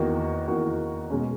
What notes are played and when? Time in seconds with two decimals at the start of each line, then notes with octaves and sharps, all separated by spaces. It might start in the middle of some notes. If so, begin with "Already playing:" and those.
Already playing: E2 D#3 A#3 D#4 F#4
0.47 E2 D#3 A#3 D#4 F#4
1.10 B2 G#3 C#4